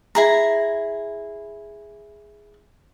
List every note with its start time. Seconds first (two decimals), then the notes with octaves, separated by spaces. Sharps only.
0.15 E4 G#4 A#5